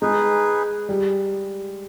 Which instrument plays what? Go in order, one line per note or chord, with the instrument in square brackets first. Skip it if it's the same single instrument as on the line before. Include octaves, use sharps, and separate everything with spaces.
[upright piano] G#3 [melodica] D#4 G#4 B4
[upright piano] G3